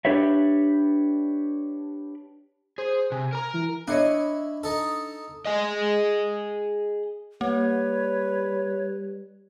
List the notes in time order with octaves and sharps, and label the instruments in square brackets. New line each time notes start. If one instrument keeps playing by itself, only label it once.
[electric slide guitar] D4 G4 B4 C#5 E5
[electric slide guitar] G#4 [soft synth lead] C5
[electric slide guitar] C3 [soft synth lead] G#5
[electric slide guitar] A#4 A#5
[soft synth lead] E3
[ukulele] D4 C#5 D#5 [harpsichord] E4
[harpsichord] D#4 A4
[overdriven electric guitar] G#4 D#5
[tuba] G3 [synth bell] A#3 [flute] B4 [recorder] C#5